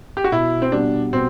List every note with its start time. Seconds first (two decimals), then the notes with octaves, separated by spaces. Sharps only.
0.17 G4
0.24 F#4
0.32 B2 E4
0.62 C4
0.72 G3 B3 D4
1.13 B2 C4